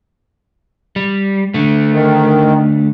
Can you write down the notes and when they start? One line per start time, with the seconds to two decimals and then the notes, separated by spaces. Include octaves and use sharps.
0.96 G3
1.54 D3 A3
1.93 D#3